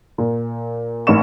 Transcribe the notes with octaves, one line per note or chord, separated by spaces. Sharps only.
A#2
A1 A#3 D#4 C#6 E7